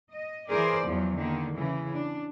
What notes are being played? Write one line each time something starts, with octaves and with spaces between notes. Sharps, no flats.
D#5
E3 G#4 A#4 C5 D5
E2 F3 F#3
D3 D#3 A#3
C#3 E3
D4